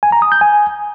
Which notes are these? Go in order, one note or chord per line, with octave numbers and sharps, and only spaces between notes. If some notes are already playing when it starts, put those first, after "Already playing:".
G#5
A#5
D#6
G6
G#5